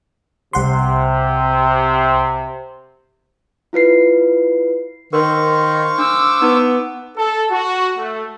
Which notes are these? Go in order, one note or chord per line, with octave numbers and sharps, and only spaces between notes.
C2 C3 F#5 C6
E4 F4 B4 C7
D#3 A#4 C5 F5 C#6
D4 D6 E6
B3 D#4
A4
F#4
A3